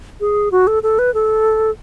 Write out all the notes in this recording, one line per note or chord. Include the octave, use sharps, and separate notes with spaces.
G#4
F#4
A4
A4
B4
A4